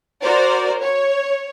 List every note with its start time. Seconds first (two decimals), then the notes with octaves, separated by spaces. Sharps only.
0.21 F#4 A#4 C5 D5
0.81 C#5